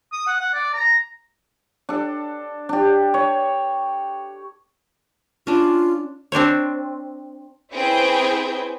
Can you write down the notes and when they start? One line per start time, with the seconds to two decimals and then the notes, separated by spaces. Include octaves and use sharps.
0.12 D#6
0.27 F#5
0.40 F#5
0.54 D5
0.74 A#5
1.89 D4 A4
2.69 D4 G4
3.14 C#5
5.47 C#4 D4 F4
6.32 C4 D4 C5 C#5
7.74 C4 C#4 E4 G#4 B4 G5